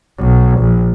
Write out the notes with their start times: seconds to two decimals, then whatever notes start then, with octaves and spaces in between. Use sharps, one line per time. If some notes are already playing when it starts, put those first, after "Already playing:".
0.18 B1
0.59 A#1